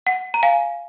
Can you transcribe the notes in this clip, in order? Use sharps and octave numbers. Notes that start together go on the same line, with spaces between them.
F#5
A#5
F5 G#5